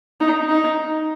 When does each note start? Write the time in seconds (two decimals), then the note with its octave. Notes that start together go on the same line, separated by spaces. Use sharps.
0.21 D#4
0.49 D#4